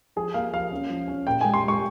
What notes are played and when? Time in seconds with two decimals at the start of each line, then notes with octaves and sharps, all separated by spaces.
0.16 F3 G#4
0.34 A#3 F5
0.53 F3 F5
0.71 C#4
0.90 F3
1.08 C#4
1.27 A#2 G5
1.41 G#3 G#5
1.54 C6
1.63 G#3 C#6